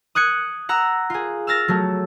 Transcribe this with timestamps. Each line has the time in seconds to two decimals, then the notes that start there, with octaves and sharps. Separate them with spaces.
0.15 D#6 F#6 G#6 C#7
0.69 F#5 A#5 E6
1.10 F4 G#4
1.47 E6 F6 A6 A#6
1.68 F#3 A3